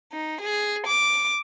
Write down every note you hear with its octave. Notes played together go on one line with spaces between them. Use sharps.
D#4
G#4
D6